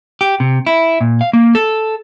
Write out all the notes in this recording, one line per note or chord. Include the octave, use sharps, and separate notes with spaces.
G4
C3
E4
A#2
F5
A#3
A4